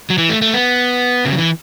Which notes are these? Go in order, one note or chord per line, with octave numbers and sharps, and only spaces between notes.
F#3
E3
A3
A3
B3
C#3
F#3
E3